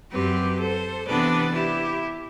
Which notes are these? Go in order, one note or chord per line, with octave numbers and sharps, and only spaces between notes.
F#2 F#3 C4 G4 B4
A4 C5
C3 E3 B3 D4 B4 D5
E4 G4